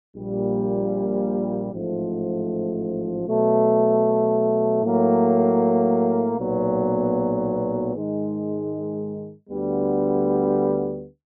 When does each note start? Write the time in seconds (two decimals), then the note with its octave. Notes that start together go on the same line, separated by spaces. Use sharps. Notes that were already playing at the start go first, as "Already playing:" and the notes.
0.16 A#1 A#2 G3
1.71 A1 G#2 F3 A3
3.27 B2 F#3 A3
4.83 A2 F#3 A#3
6.38 B1 A#2 F#3 B3
7.94 G#2 D#3 G#3
9.50 D2 D3 G3 B3